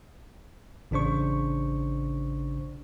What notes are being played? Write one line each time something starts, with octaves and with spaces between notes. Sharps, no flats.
A1 C#3 D4 C5 C#6